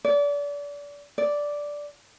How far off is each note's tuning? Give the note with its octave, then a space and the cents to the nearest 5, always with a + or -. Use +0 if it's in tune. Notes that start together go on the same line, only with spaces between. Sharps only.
D5 -30
D5 -5